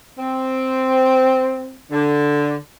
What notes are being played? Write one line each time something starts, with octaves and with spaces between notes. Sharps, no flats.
C4
D3